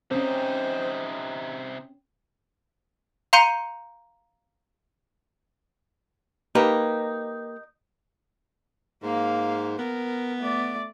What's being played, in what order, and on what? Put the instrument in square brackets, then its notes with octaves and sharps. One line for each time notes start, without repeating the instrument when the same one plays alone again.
[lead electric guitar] C3 D#4 [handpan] C4 C#4 [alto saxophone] C5
[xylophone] F5 A#5 C6 G6 C#7 D#7
[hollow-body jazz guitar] A#3 G4 B4 [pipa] D#4
[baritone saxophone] G#2 [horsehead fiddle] A#3 F5
[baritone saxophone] B3 [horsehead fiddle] A#4
[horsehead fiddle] A3 D5